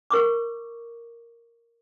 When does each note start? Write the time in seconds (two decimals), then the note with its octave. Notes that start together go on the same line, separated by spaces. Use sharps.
0.11 A#4 C#6 D6